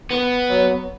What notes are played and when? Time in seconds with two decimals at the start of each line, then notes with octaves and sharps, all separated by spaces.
0.11 B3
0.50 F#3